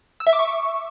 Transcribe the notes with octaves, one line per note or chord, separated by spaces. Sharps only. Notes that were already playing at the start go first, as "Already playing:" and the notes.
E6
E5
D6
C#6